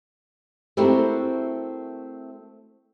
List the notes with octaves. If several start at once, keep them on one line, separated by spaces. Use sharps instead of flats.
A3 C4 E4 F#4 G4 A#4